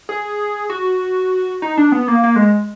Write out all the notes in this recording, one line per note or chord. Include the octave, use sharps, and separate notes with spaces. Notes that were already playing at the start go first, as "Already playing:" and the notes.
G#4
F#4
D#4
D4
B3
A#3
A#3
G#3